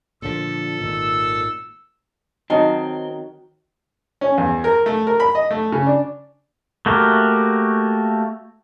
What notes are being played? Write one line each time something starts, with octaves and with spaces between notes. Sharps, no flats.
A#2 D3 F3 A4
G#1 A#2 D#3 E6
D#3 F#3 C4 D#5 G5 A5
C#4
E2
A#4
A3
A#4
B5
D#5
A3
C#3
D4
A3 A#3 F#4 G4 A#4